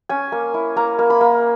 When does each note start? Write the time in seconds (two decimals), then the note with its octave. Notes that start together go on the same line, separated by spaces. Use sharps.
0.09 C#4 G#5
0.32 A#3
0.54 E4
0.76 A#3 A#5
0.99 A#3
1.10 B5
1.21 A#3